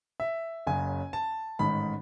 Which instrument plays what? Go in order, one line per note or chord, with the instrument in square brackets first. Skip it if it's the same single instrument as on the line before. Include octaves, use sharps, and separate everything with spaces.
[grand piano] E5
F#1 F#2 C#3 G#5
A5
A1 G#2 D#3 B5